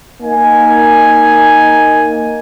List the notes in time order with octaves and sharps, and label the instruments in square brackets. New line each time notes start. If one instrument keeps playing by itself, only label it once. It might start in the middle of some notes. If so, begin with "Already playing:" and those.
[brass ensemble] A#3 D#4 G#5